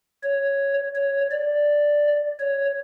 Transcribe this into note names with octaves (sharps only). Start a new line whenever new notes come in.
C#5
C#5
D5
C#5